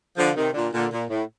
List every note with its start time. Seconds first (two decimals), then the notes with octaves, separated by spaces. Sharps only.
0.17 D3 F3
0.35 C3 D#3
0.54 A#2 D3
0.72 A#2 D3
0.91 A#2
1.09 A2